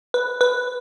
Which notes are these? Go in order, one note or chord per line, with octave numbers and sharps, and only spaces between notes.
B4
B4